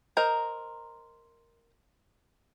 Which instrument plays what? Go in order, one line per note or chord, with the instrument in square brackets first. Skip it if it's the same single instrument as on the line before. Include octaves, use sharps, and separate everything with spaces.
[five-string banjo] A#4 C5 D#5